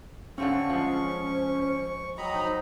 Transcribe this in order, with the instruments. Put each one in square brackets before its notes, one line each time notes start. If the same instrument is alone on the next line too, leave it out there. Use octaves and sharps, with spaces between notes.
[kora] D3 A3 C4 [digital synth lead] C#4 [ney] F5 [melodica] C#6
[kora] F3 G#3 [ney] C5
[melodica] F#3 D#5 B5 [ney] G5 [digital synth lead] A#5
[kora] D#4 [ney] C5